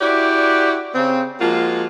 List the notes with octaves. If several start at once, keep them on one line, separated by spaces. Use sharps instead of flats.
E4 F#4 G4 D5
C#3 C4
F3 G#3 A#3 F4 F#4